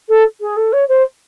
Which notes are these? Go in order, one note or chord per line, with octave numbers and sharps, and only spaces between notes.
A4
G#4
A4
C#5
C5